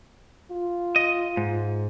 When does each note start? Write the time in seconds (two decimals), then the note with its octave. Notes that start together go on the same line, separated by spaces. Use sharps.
0.52 F4
0.96 D#5
1.37 G#2